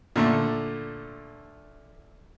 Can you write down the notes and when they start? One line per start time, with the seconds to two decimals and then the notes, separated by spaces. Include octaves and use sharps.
0.16 A#2 D3 A3